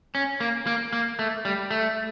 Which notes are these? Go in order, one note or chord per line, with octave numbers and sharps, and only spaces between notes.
C#4
A#3
A#3
A#3
A3
G3
A3